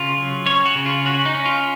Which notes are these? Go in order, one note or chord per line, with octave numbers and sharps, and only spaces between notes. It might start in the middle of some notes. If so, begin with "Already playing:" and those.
Already playing: C#3 F4
F#3
C#4 C#5
F#4
C#3
F4
C#4 F#4
D#4
C#4
F4